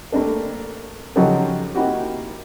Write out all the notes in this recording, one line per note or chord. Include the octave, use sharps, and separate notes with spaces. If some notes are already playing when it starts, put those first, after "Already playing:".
A3 A#3 C4 D4 A4
C#3 F3 F#3 D#4 G4 A4
A#3 C4 D#4 E4 F#4 G4